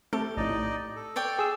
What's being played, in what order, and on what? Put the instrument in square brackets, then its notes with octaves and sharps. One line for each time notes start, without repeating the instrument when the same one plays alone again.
[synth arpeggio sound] A3 C4 A4 [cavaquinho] G4
[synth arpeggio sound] A#1 A2 [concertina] D#4 D5 D#5
[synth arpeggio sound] A2
[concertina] A4
[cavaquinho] C#5 D5 G5
[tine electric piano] G#4 E6